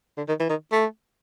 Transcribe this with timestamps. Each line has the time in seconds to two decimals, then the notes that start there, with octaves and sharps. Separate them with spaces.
0.17 D3
0.28 D#3
0.39 E3
0.49 D#3
0.72 A3